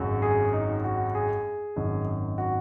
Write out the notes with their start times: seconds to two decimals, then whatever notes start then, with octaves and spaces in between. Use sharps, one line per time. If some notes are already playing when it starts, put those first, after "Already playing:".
Already playing: G#1 F#2 C#3 F#3
0.22 G#4
0.53 D#4
0.84 F#4
1.15 G#4
1.76 G#1 F#2 D#3
2.38 F#4